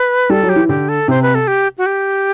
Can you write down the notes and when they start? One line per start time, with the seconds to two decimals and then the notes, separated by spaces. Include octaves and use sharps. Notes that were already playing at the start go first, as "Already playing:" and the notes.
Already playing: B4
0.30 G3 A4
0.43 F#3
0.49 G4
0.56 E3
0.68 D3 G4
0.89 A4
1.08 C3 C5
1.22 B4
1.35 A4
1.48 G4
1.78 F#4
1.86 G4